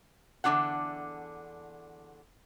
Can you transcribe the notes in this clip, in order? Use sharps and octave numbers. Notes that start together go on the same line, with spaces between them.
E2 D3 G3 D4 F4 F#5